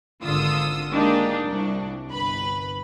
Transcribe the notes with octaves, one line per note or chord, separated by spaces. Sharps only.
G#1 D3 F4 D#6 E6
G#3 A#3 D4 D#4 F4 G4
C2 D4
G1 B4 B5